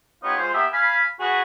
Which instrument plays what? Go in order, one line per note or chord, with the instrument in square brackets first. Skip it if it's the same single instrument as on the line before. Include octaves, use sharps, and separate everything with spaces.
[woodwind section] B3 D#4 F4 G4 B4 C#5
G#3 F4 C5
A#3 B3 G4 E5
F5 G#5 B5
F#4 G#4 B4